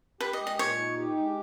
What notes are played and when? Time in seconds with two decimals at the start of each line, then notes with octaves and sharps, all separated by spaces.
0.20 G4 B4
0.33 D#5
0.40 G#3
0.47 D#5
0.59 A#2 C#5
0.79 D#4
0.97 G4
1.17 G#3